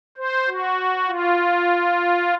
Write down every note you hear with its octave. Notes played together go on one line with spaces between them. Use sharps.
C5
F#4
F4